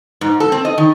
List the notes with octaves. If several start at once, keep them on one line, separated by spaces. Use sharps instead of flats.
G#2
A4
C4
D#5
D#3